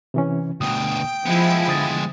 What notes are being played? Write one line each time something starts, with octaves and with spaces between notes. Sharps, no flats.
C3 E3 C#4
D2 B2 G5 D#6
F3 G#3 B3 E4
D3 D#6 A6